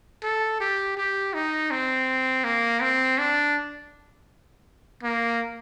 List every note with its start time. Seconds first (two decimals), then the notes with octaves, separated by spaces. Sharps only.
0.23 A4
0.60 G4
0.97 G4
1.34 D#4
1.71 C4
2.44 A#3
2.81 C4
3.18 D4
5.03 A#3